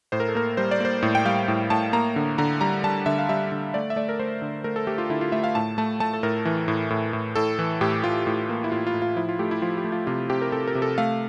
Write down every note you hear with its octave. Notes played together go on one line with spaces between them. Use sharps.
A2 C5
A#4
A4
A#3 A#4
G3 C5
D5
A#3 C5
A2
G5
G3 F5
A2
A2 A5
A#3 A#5
D3
D3 A#5
G3 A#5
G3 A5
D3 E5
F5
G3 E5
D3
A3 D5
E5
A3 D5
A#4
A3 C5
D3
A3 A#4
A4
A3 G4
F4
D3 E4
F4
A3 E5
F5
A2 A5
A3 A5
A3 A5
A4
A2 A#4
E3
A2
A2
A2
A2 A4
E3
A2 G4
A2 F4
A2
A#3
E4
A2 F4
F4
A2
F4
F3 E4
F4
A3 G4
E4
F3 F4
G4
A3
F4
C3 F4
C3 G4
A#4
C3 A4
A#4
C3
A4
A3 F5